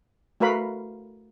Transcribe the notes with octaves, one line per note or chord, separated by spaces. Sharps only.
A3 F#4 A#4 B4 F5 B5